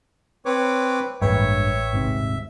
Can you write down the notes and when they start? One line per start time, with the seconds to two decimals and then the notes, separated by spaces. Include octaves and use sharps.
0.46 C4 B4 C#5 D6
1.22 A1 G2 G#3 A#3 B4 C#5 E5 G5
1.93 D#1 G#2 C3